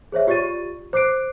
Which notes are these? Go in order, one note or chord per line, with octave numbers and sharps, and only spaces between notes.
G#4 C5 C#5 E5
F4 G4 D5 C#6 A6 D#7
C5 D6 F#6 C7 D7